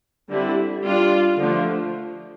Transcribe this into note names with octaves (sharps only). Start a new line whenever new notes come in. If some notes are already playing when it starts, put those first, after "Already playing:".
D3 G3 C4 E4
G3 D4 F4
D3 F3 A3